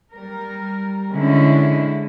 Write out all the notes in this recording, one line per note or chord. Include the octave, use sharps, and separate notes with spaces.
G3 A#4
D3 G#3 C#4 E4